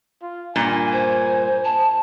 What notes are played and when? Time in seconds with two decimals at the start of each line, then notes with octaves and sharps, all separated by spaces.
0.22 F4
0.56 G2 A#2 G#5
0.92 C5
1.64 A5